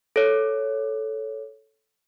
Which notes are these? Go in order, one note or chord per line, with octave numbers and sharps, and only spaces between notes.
A4 C#5